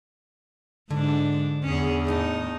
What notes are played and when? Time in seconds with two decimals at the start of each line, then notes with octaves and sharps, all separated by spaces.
0.91 G#2 D3 D4
1.64 E2 C#4 G#4
2.07 D#2 A2 D#4 A5